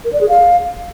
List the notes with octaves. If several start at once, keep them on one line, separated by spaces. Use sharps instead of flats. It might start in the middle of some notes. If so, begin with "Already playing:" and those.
A#4
D5
G#4
F5